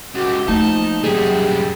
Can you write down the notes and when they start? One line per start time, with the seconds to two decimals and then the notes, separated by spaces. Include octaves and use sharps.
0.15 C#2 F#4 G4
0.48 F3 A3 A#3 D#4 A5
1.03 F#2 G3 G4 G#4